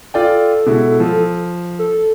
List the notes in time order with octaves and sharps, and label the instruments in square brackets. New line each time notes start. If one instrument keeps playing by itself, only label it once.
[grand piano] F4 D5 G5 [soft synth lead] A4
[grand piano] B2 G#3 E4
F3
[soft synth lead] A4